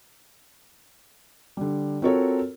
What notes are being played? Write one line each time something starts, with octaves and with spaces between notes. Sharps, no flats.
D3 G3
C4 F4 F#4 A4 A#4 C#5